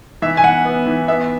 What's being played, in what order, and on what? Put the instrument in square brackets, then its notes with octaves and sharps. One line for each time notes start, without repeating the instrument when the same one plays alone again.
[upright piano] E3 E5
G#5
E3 F#5
B3
E3
B3 E5